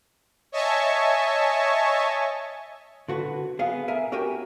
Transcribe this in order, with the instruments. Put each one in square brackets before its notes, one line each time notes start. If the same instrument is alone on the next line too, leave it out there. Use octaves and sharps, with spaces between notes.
[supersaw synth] C#5 D#5 E5 G#5 A5 C#6
[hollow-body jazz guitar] D3 F#4 B4
B3 G#4 F5
A#4 E5 G#5
F#4 G4 A#4 G5 G#5